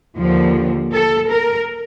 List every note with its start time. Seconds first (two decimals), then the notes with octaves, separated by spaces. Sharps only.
0.18 D#2 D3 F3
0.92 A4
1.29 A#4